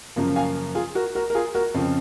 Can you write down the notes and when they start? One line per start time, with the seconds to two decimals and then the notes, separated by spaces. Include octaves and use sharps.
0.16 F#2 C#3 F3 A#3
0.36 F5 G#5
0.75 F4 G#4
0.95 F#4 A#4
1.15 F#4 A#4
1.30 A#4
1.35 F4 G#4
1.54 F#4 A#4
1.74 F2 C#3 F3